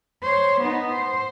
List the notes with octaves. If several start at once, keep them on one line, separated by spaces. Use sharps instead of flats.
C5 C#5
B3 D#4
C5